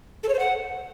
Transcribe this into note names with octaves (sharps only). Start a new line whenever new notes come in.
A4
C#5
C5
F#5